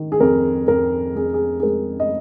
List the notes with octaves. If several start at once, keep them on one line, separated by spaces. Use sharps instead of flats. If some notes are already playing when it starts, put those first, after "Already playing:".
Already playing: D#3
G#4
F2 A#4
F2 A#4
F2 G#4
G#4
G#4
G#3 A#4
D#5